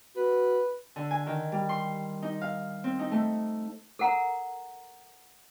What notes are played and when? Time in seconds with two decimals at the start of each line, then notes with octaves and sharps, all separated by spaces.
0.16 F#4 B4
0.96 D3
1.11 G#5
1.26 D#3
1.52 G3
1.69 C6
2.22 D#4
2.42 F5
2.84 C4
2.99 D#4
3.11 A3
3.99 A4 A#4 F#5 A#5